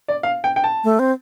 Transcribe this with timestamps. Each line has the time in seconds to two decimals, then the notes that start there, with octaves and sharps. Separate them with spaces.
0.08 D5
0.23 F5
0.44 G5
0.56 G5
0.64 A5
0.84 A3
0.99 C4